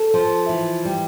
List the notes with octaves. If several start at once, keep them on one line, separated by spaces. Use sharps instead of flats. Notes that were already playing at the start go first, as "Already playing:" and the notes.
Already playing: A4
F3
E3
G3